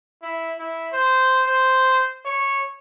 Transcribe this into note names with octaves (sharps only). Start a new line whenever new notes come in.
E4
E4
C5
C5
C#5